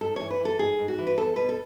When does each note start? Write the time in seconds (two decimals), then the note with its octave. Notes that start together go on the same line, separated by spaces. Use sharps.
0.01 G#2 A4
0.16 E3 C#5
0.30 B4
0.40 E3
0.45 A4
0.59 G#2 G#4
0.78 G#2
0.88 F#4
0.98 E3
1.07 B4
1.18 E2 A4
1.36 B2 B4
1.49 A4